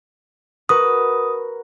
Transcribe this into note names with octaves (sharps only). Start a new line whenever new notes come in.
F#4 A#4 B4 D#6